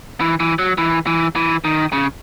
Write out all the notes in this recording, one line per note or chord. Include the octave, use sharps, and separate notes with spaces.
E3
E3
F#3
E3
E3
E3
D#3
C#3